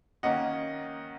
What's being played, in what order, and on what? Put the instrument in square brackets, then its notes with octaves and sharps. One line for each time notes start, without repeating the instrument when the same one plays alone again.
[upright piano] D#3 A#3 C#4 D#5 F#5